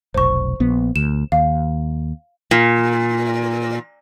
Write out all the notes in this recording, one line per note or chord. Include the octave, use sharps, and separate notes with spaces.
F1 B1 C5 C#6
A#1 B3
D2 E7
D#2 F5
A#2